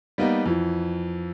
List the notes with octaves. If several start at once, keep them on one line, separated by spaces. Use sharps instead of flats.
G3 A#3 B3 D#4
F2 E3